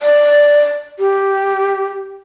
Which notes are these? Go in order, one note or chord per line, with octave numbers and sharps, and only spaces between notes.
D5
G4